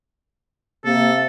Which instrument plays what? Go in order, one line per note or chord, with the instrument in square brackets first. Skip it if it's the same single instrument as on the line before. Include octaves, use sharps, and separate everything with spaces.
[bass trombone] C3 [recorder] A#3 [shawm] A4